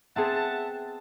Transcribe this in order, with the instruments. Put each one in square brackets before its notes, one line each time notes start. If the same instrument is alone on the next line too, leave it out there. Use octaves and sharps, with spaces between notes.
[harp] B3 C4 G#4 [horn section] E5 F#5 A5